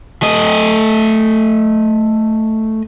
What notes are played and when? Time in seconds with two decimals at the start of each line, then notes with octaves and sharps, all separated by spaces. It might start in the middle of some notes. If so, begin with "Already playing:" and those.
0.23 A3 D#5